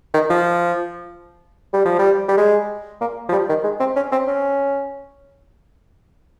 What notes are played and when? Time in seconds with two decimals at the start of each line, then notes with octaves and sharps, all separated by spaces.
0.14 D#3
0.30 F3
1.73 G3
1.85 F3
1.99 G3
2.28 G3
2.37 G#3
3.01 A#3
3.29 F3
3.32 G3
3.49 D#3
3.64 G#3
3.80 C4
3.96 C#4
4.12 C4
4.27 C#4